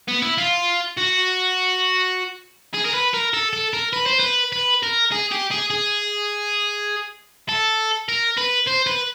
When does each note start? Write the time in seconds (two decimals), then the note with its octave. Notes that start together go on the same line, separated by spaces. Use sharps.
0.08 B3
0.22 E4
0.38 F4
0.97 F#4
2.74 G#4
2.86 A#4
2.94 B4
3.14 A#4
3.34 A4
3.53 A4
3.74 A#4
3.93 B4
4.06 C5
4.20 B4
4.52 B4
4.83 A#4
5.12 G#4
5.31 G4
5.51 G#4
5.70 G#4
7.49 A4
8.09 A#4
8.38 B4
8.67 C5
8.87 B4